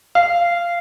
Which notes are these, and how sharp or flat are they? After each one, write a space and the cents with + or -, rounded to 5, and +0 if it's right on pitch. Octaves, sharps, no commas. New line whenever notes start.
F5 -15